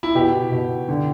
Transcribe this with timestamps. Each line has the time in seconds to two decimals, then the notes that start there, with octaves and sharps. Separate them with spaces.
0.03 E4
0.15 B2 G4
0.52 B2
0.88 D3